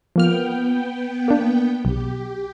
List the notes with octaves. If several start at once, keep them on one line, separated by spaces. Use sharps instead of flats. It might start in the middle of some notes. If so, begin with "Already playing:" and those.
F3 A#3 B3 G5 F6
A#3 D4
B1 G4